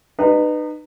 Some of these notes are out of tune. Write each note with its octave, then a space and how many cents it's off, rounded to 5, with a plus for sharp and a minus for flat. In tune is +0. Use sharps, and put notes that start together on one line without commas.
D#4 -35 B4 +0